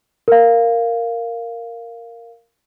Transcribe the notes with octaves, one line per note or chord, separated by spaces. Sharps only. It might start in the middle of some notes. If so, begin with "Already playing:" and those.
A#4 F5